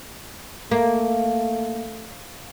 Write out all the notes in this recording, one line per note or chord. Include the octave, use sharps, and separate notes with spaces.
A3 A#3